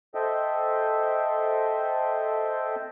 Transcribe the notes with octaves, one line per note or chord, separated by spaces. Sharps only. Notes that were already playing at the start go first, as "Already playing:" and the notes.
A4 C5 D#5 E5 G5